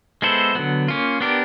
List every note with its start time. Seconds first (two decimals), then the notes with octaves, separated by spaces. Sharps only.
0.22 G#3 B3 E4 A4 C5
0.55 D3 F#3 B3
0.88 A#3 C#4 F4
1.21 B3 D4 G4 A#4